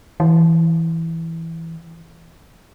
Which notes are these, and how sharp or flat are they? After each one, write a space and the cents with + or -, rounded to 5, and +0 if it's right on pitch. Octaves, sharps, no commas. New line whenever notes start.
E3 -5